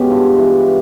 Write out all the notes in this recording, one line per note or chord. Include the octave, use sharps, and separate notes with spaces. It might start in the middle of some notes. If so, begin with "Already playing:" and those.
Already playing: B2 G#3 C#4 G4
G2 F4
E3